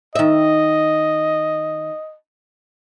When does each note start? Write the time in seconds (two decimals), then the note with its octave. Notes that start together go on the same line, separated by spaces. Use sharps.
0.15 D#3 D#5 E5